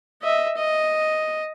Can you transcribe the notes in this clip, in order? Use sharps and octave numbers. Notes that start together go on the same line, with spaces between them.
D#5 E5
D#5